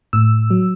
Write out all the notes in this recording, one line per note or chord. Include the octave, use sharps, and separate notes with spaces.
A2 E6
F#3